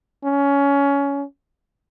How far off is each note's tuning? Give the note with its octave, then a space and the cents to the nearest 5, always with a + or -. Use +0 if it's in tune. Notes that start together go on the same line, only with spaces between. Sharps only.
C#4 +20